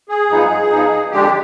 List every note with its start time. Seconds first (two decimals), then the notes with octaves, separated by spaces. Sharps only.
0.09 G#4
0.29 G2 F3 B3 D#4
0.70 G2 F3 B3 D#4
1.11 F2 D3 G#3 D4 G4